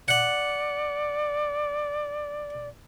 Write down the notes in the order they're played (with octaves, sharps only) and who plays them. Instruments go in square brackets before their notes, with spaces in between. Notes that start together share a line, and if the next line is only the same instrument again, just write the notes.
[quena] D5 [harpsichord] F#5